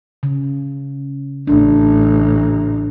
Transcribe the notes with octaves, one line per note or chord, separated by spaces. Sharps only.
C#3
A1 D4